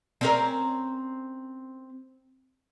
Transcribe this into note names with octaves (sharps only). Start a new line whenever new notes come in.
C4 C#4 A#4